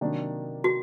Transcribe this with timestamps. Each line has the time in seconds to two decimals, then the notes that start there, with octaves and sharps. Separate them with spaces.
0.01 C3 D#3 F#3 A#3 D4
0.64 F#4